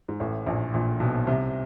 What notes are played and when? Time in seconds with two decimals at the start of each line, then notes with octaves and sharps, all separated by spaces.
0.08 G#2
0.20 A1 A2
0.47 A#1 A#2
0.74 A#1 A#2
1.00 B1 B2
1.27 C2 C3